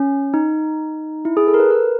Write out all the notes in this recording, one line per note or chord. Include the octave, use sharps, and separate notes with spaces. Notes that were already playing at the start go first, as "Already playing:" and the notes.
Already playing: C#4
D#4
E4
G#4
A4
A#4
B4
A#4